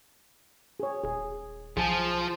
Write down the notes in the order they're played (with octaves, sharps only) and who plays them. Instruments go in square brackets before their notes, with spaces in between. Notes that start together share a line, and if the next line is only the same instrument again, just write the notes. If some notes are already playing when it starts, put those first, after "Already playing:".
[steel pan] G#4 C#5
[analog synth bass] D#1 [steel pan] G#4
[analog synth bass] B1 [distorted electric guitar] F3 [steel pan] G#4 G#5